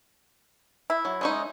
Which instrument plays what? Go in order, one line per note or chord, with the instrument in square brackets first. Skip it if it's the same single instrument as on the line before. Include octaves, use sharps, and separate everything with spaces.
[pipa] E4
[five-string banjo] F#3
G#3 C#4 D#4